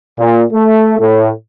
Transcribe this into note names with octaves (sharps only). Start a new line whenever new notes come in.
A#2
A3
A2